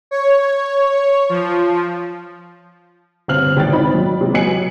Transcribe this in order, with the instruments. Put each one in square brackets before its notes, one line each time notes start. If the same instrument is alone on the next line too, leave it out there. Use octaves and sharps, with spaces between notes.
[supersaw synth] C#5
F3
[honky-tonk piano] G1 C4 F6 F#7
G#1 G5 A6
C4 D#4 B5
F#3
C3 G#3
F#3 D#5 G#5 C#7 F#7